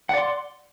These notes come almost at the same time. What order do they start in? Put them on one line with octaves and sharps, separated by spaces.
F#5 D5 C6